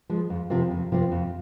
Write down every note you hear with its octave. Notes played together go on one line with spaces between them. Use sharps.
F3 G#3
F2
C3 F3 C4 F4
F2
C3 F3 C4 F4
F2